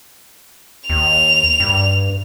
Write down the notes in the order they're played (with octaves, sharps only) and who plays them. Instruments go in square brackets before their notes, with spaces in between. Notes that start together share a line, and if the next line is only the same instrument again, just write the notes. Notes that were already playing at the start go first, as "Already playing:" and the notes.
[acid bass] D#2 [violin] F7
[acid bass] G2